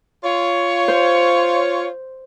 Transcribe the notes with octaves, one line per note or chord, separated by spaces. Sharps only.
F4 C#5
C5